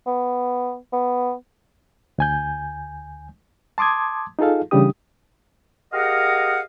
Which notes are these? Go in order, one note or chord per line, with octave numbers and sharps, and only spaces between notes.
B3
B3
D2 G#5 G6
A5 C6 D6 D#6 G#6
D#4 F4 G#4 A4 F5
C#3 E3 G3 D4 G4 D#6
G4 G#4 A#4 D#5 F5 F#5